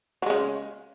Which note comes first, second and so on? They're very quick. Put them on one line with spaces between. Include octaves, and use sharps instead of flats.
F#3 G#3 C#3